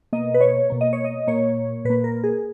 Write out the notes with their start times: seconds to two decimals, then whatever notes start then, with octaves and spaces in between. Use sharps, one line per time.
0.13 B2 A#3 D#5
0.34 B4
0.41 C#5
0.70 B2 A#3
0.81 D#5
0.93 C#5
1.04 D#5
1.27 A#2 A#3 C#5
1.85 A#2 A#3 B4
2.04 A#4
2.24 G#4